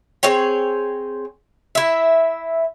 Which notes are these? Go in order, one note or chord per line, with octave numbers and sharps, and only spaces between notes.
C4 G#4 C#5 G5
E4 E5